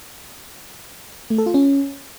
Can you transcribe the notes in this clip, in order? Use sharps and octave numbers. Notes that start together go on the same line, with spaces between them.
A3
A4
F4
C#4